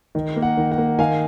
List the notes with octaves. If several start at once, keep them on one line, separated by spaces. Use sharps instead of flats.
D#3
A#3
F#5
D#3
F#5
A#3
D#3 F5 G#5